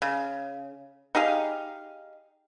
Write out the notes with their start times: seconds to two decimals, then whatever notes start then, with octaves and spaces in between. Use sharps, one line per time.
0.02 C#3
1.15 D#4 G4 G#4 F5